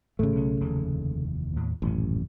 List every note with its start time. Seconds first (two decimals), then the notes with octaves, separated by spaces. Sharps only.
0.19 G#1 G#2 C#3 A3
0.36 B1 C#4
0.60 F1 D#2 E3
1.56 D#2 A2
1.82 D#1 A1 F#2 C#4